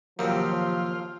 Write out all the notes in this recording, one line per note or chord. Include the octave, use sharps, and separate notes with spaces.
D#2 C3 F3 F#3 A#3 F4